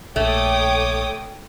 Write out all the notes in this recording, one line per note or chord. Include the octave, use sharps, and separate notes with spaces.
A#1 A3 C#5 G5 D6 D#6